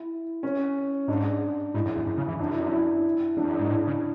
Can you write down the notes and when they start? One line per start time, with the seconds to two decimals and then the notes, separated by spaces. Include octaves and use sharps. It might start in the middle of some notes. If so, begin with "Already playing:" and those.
Already playing: E4
0.43 C#4
1.08 G#2 D4
1.74 G#2 E4
1.85 F#2
1.95 E2
2.06 F#2
2.17 C#3
2.28 E3
2.39 F#2 D4
2.50 E4
2.62 D4
2.72 E4
3.37 E2 D4
3.47 F#2
3.59 G#2
3.71 A2
3.87 C#3